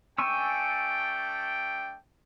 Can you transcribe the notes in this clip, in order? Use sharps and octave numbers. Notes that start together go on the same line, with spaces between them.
A3 D4 G5 G#5 C#6 E6